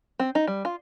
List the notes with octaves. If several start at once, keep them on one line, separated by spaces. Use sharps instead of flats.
C4
D#4
G3
F4